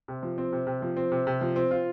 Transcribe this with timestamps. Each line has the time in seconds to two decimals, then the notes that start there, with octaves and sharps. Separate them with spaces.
0.08 C3
0.23 F3
0.38 C4
0.52 C3
0.67 C3
0.82 F3
0.97 C4
1.12 C3
1.27 C3
1.41 F3
1.56 C4
1.71 F4